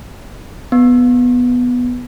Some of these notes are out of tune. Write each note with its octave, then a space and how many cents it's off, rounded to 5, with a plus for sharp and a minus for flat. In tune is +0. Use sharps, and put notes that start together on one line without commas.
B3 +0